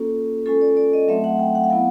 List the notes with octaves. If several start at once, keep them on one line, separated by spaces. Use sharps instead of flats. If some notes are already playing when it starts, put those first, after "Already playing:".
Already playing: A#3 C#4 F4 A4
G#3 C#4 F4 A4
D5
D5
D#5
F#3 A3 C4 E5
F#5
G5
F#5
F5
F#3 B3 E4 F#5